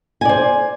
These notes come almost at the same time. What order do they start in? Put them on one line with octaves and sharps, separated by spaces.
G#5 D5 C5